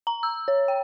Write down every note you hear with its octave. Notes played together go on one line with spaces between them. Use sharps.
A#5
E6
C#5
G5